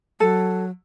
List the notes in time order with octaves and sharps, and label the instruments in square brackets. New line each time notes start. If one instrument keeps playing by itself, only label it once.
[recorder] F#3 [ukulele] A4